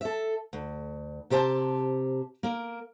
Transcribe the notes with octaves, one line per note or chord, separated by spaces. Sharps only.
A4 E5
D2
C3 G4 C5 G#5 A5
A#3 A#4